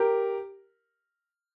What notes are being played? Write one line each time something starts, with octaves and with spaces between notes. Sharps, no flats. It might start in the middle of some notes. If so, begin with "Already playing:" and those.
Already playing: G4 A#4